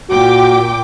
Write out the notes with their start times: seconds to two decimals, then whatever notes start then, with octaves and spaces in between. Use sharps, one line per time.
0.10 A#2 F#4 G5 D6